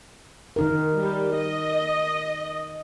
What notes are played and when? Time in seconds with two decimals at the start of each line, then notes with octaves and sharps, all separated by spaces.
0.56 D#3 D#4 A#4
0.92 G3
1.34 D#5